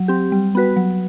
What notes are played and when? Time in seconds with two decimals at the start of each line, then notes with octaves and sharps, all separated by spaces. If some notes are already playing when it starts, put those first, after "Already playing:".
Already playing: F#3
0.08 C4 G4
0.32 G3
0.55 B3 F#4 B4
0.76 F#3